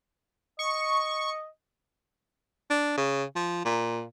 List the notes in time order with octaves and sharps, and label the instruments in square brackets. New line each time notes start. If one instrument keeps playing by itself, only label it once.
[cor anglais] D#5 [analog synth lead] C#6
[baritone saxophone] D4
C#3
F3
A#2